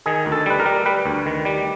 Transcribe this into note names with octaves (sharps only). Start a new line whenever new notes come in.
D#3 G#4
D2
A4
G3 B4
A#4
G3
G3 B4
D2
D#3
G3